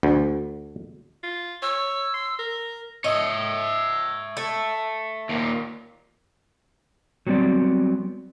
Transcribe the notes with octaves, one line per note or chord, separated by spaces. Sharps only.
D2
F4
C#5 E6
C6
A#4
C#5 D#5 E5
A3
D#2 A#2
F#3 G3 B3 C4 D5